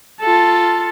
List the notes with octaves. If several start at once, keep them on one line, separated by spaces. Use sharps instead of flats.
F4 A4